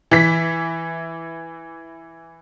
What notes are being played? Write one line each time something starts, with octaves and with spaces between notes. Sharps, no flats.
E3 B6